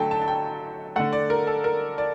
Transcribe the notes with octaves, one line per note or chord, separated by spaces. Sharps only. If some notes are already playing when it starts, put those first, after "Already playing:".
Already playing: D3 F#3 A3 G5 A5
A5
A5
G5
D3 A3 F#5
D5
A#4
A4
A#4
D5